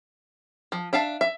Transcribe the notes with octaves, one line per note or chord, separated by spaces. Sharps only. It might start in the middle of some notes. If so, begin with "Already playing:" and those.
F3
D4 E5 F5 A5
E5